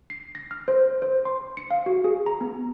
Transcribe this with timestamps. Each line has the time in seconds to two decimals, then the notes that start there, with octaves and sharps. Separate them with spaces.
0.10 C7
0.35 A#6
0.51 F6
0.68 C5
1.02 C5
1.25 C6
1.57 C#7
1.71 F5
1.86 F#4
2.04 G#4
2.26 A#5
2.41 B3